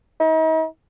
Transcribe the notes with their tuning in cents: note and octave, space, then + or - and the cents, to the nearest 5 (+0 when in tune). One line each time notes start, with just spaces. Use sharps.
D#4 +40